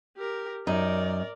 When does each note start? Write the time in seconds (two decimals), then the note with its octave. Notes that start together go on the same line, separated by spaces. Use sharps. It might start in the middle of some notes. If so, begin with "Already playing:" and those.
0.17 G4 A#4
0.67 F#2 D#4 A#4 D5